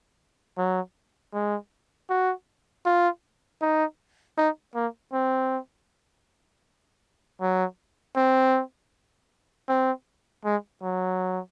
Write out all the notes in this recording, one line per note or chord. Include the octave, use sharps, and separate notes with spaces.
F#3
G#3
F#4
F4
D#4
D#4
A#3
C4
F#3
C4
C4
G#3
F#3